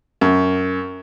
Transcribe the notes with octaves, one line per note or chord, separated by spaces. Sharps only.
F#2